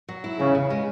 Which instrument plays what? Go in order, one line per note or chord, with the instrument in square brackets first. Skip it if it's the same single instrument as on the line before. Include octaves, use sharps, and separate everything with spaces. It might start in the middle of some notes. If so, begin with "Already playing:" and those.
[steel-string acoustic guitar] F#3
E4
[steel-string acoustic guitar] E2 [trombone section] C#3
[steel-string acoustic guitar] C#3
G#3